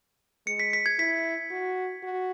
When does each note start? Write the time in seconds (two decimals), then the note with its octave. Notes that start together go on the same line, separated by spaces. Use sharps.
0.47 G#3 C#7
0.59 B6
0.73 B6
0.86 G#6
0.99 E4 B6
1.51 F#4
2.03 F#4